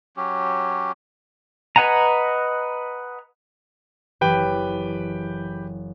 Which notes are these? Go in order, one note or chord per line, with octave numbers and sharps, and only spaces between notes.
F#3 C#4 G4
B4 D#5 F#5 G#5 A#5
F#1 E3 G4 B4 G5